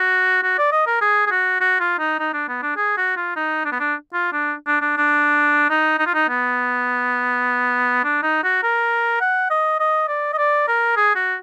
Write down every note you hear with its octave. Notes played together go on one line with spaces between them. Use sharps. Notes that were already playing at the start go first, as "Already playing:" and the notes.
Already playing: F#4
F#4
D5
D#5
A#4
G#4
G#4
F#4
F#4
F4
D#4
D#4
D4
B3
D4
G#4
F#4
F4
D#4
D4
B3
D4
F4
D4
D4
D4
D4
D#4
D#4
F4
D#4
B3
D4
D#4
F#4
A#4
F#5
D#5
D#5
D5
D#5
D5
A#4
G#4
F#4